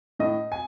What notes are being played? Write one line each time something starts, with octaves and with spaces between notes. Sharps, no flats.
A2 D#5
G#5